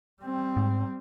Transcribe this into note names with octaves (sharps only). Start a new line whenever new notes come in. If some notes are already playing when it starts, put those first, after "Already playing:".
G3 C4
G#2